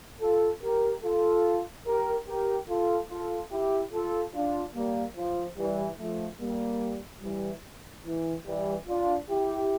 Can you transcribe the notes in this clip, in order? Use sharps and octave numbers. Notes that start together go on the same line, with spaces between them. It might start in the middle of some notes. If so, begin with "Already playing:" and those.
F4 A4
G4 A#4
F4 A4
G4 A#4
G4 A#4
F4 A4
F4 A4
E4 G4
F4 A4
D4 F4
G3 A#3
F3
E3 G3
F3 A3
G3 A#3
E3 G3
E3
E3 G3
D4 F4
E4 G4